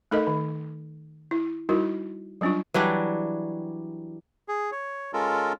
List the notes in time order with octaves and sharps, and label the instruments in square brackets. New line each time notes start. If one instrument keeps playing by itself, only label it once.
[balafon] A3 D#4 A4 A#4 D#5
D#3
E4
G3 D#4 E4 F#4 A#4
F#3 G3 C#4 D4 F4
[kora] E3 F#3 G3 D4
[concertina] G#4
C#5
G#3 C#4 F4 A4 A#4